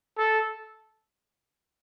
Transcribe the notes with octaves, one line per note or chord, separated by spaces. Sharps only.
A4